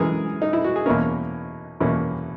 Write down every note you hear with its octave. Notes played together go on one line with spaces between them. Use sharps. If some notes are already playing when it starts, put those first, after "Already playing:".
Already playing: F#2 E3 G#3 G#4 A#4
D#4
E4
F#4
G#4
E2 B2 A#3 C#4 A#4
E2 B2 A#3 C#4